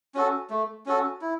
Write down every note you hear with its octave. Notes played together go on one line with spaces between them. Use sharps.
C#4 F#4 A4
A3
C#4 F#4 A4
E4